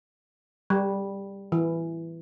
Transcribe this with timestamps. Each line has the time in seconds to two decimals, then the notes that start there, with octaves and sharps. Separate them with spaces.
0.70 G3
1.52 E3